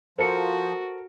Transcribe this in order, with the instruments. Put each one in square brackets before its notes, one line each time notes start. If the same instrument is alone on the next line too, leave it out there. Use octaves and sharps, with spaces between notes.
[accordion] F3 [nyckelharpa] F#4 [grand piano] A4 A#4 [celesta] C5 C#7